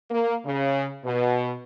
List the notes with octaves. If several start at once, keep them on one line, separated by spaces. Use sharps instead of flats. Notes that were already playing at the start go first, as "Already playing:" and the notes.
A#3
C#3
B2